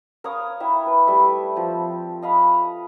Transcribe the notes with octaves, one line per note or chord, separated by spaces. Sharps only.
A#4 C#5 F5 D#6
E4 E5 G5
B4 A5
G3 A3 D5 E5
F3 C4
D#5 F5 B5